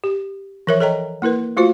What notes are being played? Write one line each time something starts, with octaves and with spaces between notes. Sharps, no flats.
G4
E3 F3 A#4 C#5 E5
A4 A#4 C#5 D#5 G5 A#5
A#3 E4 A#4 B4
A3 F4 F#4 C5 F5